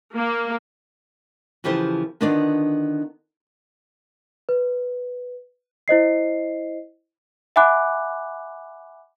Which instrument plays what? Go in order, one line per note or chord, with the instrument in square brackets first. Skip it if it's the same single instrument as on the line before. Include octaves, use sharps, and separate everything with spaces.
[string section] A#3
[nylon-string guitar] C#3 E3 F3 G4 A4 C5
D3 D#3 B3 D4 F4 D5
[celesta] B4
E4 C5 D#5 C7
E5 F#5 G#5 B5 D6 F#6